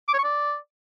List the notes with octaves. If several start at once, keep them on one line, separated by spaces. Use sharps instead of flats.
D6
C#5
C#6
D5